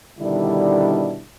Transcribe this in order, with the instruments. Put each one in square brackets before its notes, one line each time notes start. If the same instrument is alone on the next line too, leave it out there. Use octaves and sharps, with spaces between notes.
[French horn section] B2 D3 D#3 G3 D4 E4